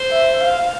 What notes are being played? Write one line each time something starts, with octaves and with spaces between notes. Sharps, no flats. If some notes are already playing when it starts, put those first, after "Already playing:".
Already playing: C5
E5
F5